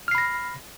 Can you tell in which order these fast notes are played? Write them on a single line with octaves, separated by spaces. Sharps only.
F6 C7 B5 A#6